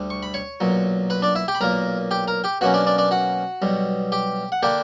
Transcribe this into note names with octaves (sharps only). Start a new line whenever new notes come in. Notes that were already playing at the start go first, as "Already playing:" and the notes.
Already playing: D2 D3 G3
C#6
B5
C#5 C#6
B1 A#2 F#3
B4 B5
D4 D5
E4 E5
G4 G5
B5
B1 A#2 A#3 A#4 A#5
G4 G5
A#4 A#5
G4 G5
B2 F#3 A#3 C#4 F#4 F#5
D4 D5
D4 D5
D4 D5
F#4 F#5
B1 B2 G3
G4 G5
F#5
D3 A#3 D4 G4 G5